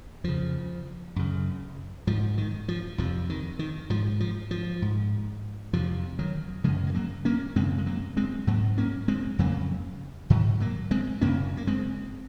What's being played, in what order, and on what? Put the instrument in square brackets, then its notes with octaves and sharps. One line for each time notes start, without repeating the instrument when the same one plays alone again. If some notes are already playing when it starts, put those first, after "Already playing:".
[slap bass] F2 C#3 F3
F#2 C#3
G#2 F3
D#3
F3
F2 C3 F3
D#3
D#3
G#2 F3
F3
F3
G#2
F2 C3 F3
D#3 F#3
F#2 C#3 F3 G#3
G#3
F#3 A#3
A#3 C#4
F#2 C#3 G#3 C4
G#3
F#3 A#3
G#3 C4
G#2 F#3 A#3
A#3 C#4
G#3 C4
F2 C#3 F#3 A#3
G#2 D#3 F#3
F#3 A#3
G#3 C4
F#2 C#3 A#3 C#4
A#3
G#3 C4